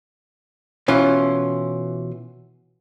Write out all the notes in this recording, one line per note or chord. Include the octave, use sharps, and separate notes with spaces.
B2 E3 C#4 F4